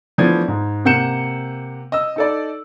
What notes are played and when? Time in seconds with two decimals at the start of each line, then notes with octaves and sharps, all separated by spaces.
0.18 E3 F3 A3 B3 D4 G#6
0.48 G#2
0.85 C3 A#3 F#5 G6 C#7 E7
1.92 D#5 E6
2.16 D#4 A4 D5